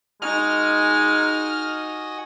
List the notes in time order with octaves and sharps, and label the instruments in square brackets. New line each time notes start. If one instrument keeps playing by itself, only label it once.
[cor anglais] G#3 [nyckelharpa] D#4 [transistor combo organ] F#4 D#5 G#5 [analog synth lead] F6